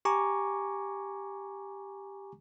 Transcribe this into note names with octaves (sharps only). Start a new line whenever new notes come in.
G4 G#5 A#5 C#6 D6